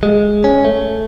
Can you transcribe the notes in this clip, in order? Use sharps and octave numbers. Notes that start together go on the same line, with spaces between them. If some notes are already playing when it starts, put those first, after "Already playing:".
G#3
C#4
A3